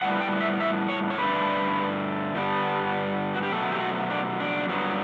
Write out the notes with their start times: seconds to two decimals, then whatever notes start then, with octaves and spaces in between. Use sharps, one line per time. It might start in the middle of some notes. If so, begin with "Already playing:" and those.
0.02 A2 G3 B3 F#5
0.21 G5
0.41 E5
0.60 E5
0.89 C#5
1.10 C#5
1.18 G2 D3 A3 B4
2.35 G2 D3 G3 B3
3.34 F#4
3.43 G4
3.52 B2 F#3 A3 A4
3.72 G4
3.81 F#4
4.10 D4
4.40 D4
4.69 G2 F#3 B3